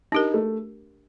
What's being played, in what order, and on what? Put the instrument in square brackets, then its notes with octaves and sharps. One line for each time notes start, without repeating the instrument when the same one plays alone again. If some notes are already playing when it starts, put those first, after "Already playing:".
[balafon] D4 G4 A#4 [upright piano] D#4
[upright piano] A3